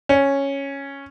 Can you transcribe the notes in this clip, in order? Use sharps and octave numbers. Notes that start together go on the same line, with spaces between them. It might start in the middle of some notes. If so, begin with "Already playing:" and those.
C#4